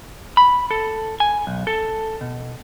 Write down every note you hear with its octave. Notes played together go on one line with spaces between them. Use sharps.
B5
A4
G#5
B1
A4
B2